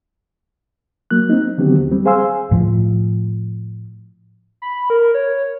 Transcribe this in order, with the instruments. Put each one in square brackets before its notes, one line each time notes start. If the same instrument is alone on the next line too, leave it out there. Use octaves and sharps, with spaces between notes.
[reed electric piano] F#3 A#3 F#6
C4 D#4
D3 D#3 F#3 B3 C4 G4
D#2
G3 C4
G#4 C5 F5 G#5 C6 E6
[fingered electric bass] A2 F3
[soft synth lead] B5
A#4
C#5